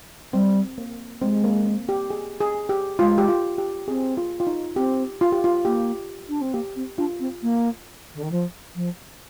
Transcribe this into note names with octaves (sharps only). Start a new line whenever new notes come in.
G3 C4
A#3
G#3 C4
A#3
C4
G4
G#4
G#4
G4
G#3 F4
G4
F4
G4
C4 G#4
F4
F4
D#4
C4 G4
F4
G4
F4
A#3 G4
D4
C4
A#3 G4
C4
D4 F4
C4
A#3
D3
D#3
F3
F3